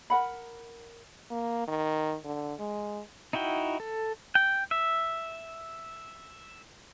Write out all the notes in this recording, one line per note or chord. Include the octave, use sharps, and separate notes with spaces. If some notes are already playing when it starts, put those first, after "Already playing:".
A#4 F#5 B5
A#3
D#3
D3
G#3
D#4 E4 F#4 G5
A4
G5
E5